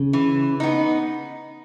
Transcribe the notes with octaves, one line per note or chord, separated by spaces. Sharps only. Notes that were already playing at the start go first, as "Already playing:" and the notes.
Already playing: C#3
E3
B3 D#4